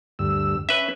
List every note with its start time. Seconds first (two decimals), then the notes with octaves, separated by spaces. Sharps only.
0.19 D2 G2 E6
0.69 C#4 B4 E5